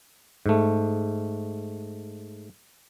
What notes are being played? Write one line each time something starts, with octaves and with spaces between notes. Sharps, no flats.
G#2 A3